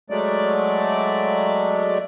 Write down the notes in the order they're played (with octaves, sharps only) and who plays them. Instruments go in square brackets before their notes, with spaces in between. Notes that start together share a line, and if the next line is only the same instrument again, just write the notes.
[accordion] F#3 G#3 A3 D5